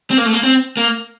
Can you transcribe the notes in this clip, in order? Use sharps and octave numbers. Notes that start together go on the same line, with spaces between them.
C4
A#3
A3
A#3
C4
A#3